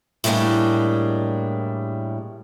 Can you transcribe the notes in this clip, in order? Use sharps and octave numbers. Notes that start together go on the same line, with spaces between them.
A2 G3 G#3 A#3 D4